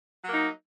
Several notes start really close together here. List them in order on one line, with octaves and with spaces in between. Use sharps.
F#3 A#3 D#4